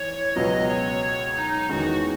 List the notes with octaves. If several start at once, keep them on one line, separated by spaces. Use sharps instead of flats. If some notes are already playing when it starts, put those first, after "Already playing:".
Already playing: E3 C#5
C#2 B2 F#3 B3 D#5
C#5
D#4
E2 D#3 G#3 C#4 F#4 G#4